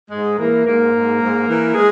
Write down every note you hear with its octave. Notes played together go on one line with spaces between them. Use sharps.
G#2 G#3 G#4
E3 A#3 A#4
G#2 A#3 A#4
G#2
G#2
E3
G#3 G#4